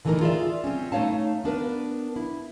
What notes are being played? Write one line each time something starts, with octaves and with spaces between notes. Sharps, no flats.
D3 E3 A3 C#4 D#4 A#4
F4 G#4 D5 E5
C4 C#4
A3 D#4 C#5 F5 A5
B3 D4 A#4 B4
E4